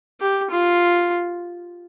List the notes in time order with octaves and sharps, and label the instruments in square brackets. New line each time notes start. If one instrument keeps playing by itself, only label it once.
[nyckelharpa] G4
F4